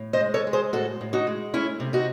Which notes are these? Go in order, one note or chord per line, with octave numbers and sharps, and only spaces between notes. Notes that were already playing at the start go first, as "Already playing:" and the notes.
Already playing: A2
C5 D#5
G#3
A4 C#5
G#3
G#4 C5
A2 F#4 A4
A2
D#4 F#4
G#3
A3 C#4 E4
C3
D#4 F#4